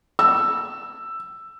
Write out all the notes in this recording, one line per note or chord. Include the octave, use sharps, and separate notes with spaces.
E6